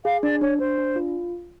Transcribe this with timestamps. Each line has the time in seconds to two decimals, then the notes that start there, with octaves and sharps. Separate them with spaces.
0.04 G#4 F5
0.23 D4 D5
0.41 D4 C#5
0.59 D4 C5
0.78 D4
0.96 F4